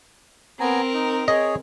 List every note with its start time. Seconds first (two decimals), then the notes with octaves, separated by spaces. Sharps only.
0.60 B3 C4 A#4 G#5 A#5
0.94 D#4
1.28 G#4 C#5 D#5